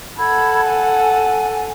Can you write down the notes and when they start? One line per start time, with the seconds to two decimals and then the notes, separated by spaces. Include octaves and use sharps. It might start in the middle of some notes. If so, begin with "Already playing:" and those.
0.18 A4 F#5 B5 E6 G#6
0.64 G#5